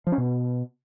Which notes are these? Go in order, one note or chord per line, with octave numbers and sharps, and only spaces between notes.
F3
C#4
B2